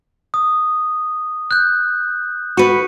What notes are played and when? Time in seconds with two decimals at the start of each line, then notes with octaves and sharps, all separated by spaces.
0.34 D#6
1.51 F#6 G6
2.57 F#4 B4 C#6 C#7 D#7